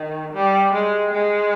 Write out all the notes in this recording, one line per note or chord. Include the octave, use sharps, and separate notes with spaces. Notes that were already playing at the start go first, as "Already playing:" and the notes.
Already playing: D#3
G3
G#3
G#3